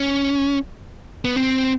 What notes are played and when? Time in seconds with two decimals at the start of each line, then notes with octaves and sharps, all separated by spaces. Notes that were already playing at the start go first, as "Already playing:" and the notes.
Already playing: C#4
1.25 B3
1.36 C4